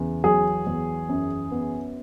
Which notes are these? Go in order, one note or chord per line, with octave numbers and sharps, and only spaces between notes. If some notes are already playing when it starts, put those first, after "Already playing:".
Already playing: E2 C#3
F#3 G#4
E2
F#2
B3